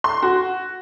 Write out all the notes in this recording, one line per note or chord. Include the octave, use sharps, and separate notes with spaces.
C6
F#4